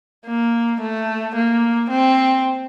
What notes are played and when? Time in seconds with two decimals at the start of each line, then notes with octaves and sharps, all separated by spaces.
0.26 A#3
0.81 A3
1.35 A#3
1.90 C4